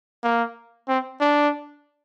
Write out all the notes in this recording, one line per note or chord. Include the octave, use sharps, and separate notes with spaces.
A#3
C4
D4